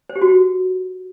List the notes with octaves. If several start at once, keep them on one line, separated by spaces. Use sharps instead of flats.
C5
G4
F#4